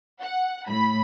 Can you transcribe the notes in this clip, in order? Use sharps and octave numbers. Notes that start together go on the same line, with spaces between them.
F#5
A2 B5